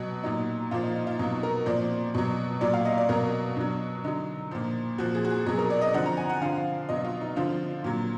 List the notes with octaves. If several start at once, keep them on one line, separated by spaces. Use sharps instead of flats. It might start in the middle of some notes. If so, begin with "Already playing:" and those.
Already playing: B2 F#3
A#2 F#3 D#4
A#2 F3 F4
D#4
D#4
F4
B2 F#3 D#4
A#4
A#2 F3 D5
B2 F#3
A#2 F#3 D5
F5
D#5
D5
B2 F#3 A#4
B2 F#3 D4
D3 F#3 D#4
A#2 F3
A#2 F3 F#4
G#4
F#4
G#4
B2 F#3 G#4
A#4
D5
D#5
D3 F3 F#5
A#5
G#5
F#5
D3 F3 F5
B2 F#3 D#5
F4
D#4
D3 F3 F4
A#2 F#3